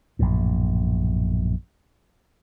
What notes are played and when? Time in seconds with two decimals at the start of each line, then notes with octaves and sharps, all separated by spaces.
0.19 A#1 F#2 A2